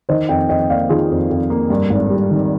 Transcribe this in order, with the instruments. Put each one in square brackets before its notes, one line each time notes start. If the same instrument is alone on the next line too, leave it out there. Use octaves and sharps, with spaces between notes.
[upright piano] D#3 C5 D#5
F2 D#5 G5
F2 D#5 G5
A#3 D5 F5
D#3 F4 G#4
F2
F2
A#3
G2
G#1
G3
D#3